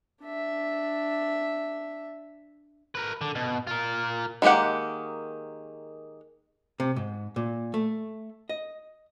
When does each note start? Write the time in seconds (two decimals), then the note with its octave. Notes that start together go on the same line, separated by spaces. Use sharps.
0.22 D4 E5
2.95 A#4 B4
3.21 D3
3.35 B2
3.67 F4 A#4
4.42 D#3 G#3 A#3 G4 F#5
6.80 C3
6.96 G#2
7.36 A#2
7.74 A3
8.49 D#5